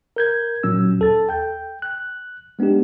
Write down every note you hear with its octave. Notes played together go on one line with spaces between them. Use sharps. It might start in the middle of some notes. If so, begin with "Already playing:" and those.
A#4 G6 G#6
A#2 F#3 C#4 E6
D#2 A4 A6
G5 G6
F#6
G#3 B3 D4 D#4 G4